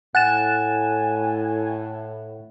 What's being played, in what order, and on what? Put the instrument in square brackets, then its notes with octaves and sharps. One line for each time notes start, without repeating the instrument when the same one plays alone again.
[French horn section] A2 [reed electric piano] F#5 [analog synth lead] G#5 [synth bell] F#6 A6 E7